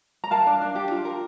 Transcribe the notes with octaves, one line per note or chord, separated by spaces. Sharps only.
A#5
A#4 F5 A5
D4
D4
G4
F4
A#4